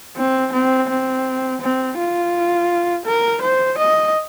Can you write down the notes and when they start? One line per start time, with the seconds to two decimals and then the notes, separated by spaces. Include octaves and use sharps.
0.16 C4
0.53 C4
0.89 C4
1.61 C4
1.98 F4
3.06 A#4
3.42 C5
3.78 D#5